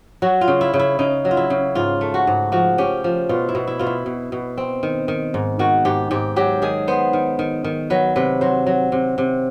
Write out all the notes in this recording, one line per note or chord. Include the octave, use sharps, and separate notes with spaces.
F#3 F#4
F4
C#3
E4
C#3
E4
C#3 D#4
F#3
F4
E4
C#3
G#2 F4
A3
F#4
G#2
F3 F#4
C#4 G4
F3
B2 F4
E4
B2
E4
B2 F4
E4
B2
B2
C4
D#3
D#3
G#2
D#3 F#4
G#2 G4
G#2 G4
F#3 G4
D#3 G#4
B3 C5
D#3
D#3
D#3
F#3 B4
C3 B4
F#3 C5
F#3
C3
C3